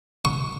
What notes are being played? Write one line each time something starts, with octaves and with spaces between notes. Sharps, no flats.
C#6